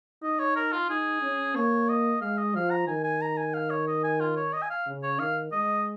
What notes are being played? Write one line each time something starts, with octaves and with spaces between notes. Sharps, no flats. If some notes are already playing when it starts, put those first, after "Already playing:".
D#4 D#5
C#5
A#4
F4
D#4 G#4
C#4
A#3 C#5
D#5
G#3 F5
D#5
F3 F5
A#5
D#3 G#5
G#5
A#5
G#5
F5
C#5
D#5
G#5
F4
C#5
D#5
G#5
F5
C#3
C#5
D#3 F5
G#3 D#5